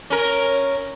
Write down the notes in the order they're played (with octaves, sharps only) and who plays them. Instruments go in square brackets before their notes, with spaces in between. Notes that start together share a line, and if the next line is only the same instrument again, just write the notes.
[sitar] C#4 A#4